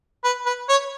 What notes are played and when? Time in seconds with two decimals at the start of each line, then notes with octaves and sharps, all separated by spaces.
0.24 B4
0.46 B4
0.69 C#5